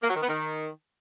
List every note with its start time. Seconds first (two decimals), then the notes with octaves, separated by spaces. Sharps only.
0.03 A#3
0.09 F#3
0.16 D#3
0.22 B3
0.29 D#3